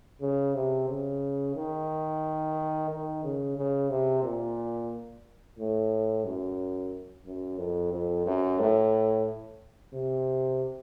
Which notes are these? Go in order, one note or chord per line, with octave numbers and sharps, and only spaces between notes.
C#3
C3
C#3
D#3
D#3
C#3
C#3
C3
A#2
A2
F#2
F#2
F2
F2
F#2
A2
C3